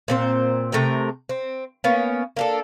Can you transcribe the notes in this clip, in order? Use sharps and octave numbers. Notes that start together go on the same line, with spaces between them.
A#2 C4 C5
C3 A3 A#4 G5
C4
A#3 B3 C#4
A#3 D4 A4